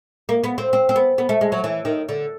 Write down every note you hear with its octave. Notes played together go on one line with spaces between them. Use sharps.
A#3
B3
C4
C4
C4
B3
B3
A3
G#3
F#3
E3
D#3
D3